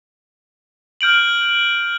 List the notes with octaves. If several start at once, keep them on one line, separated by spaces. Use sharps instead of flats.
F6 G6 D7 F#7